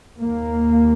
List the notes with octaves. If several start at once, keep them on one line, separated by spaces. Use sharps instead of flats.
D#2 A#3